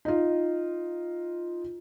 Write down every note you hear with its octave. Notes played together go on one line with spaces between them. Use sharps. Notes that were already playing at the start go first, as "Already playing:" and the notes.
D#4 F4